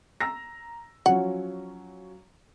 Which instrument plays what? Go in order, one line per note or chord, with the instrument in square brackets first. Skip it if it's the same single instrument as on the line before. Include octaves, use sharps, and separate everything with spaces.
[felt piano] A#5 E6 A#6
[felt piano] F3 F#3 C#4 [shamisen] F#5